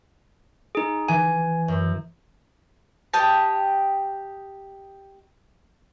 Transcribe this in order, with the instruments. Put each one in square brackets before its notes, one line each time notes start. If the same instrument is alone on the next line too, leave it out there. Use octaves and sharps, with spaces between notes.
[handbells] D#4 G#4
[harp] E3 [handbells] G#5
[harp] F#2
[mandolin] G4 D#5 G5 A5